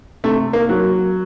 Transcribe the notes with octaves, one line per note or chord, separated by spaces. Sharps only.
C3 A3
A#3
F#3